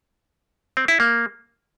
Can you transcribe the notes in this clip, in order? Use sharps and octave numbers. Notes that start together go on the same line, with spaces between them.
C4
E4
A#3